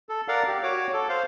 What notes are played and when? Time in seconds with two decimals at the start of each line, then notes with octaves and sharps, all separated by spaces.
0.09 A4
0.28 A#4 D5 F5 F#5
0.48 G4
0.63 F#4 C#5 D6
0.93 A4
1.09 C5 F5